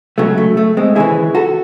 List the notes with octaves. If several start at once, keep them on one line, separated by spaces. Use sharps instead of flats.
C#2 C#3 F#3 A3
A3
A3
G#3 C4
D#2 C#3 E3 E4 G#4
F#4 A4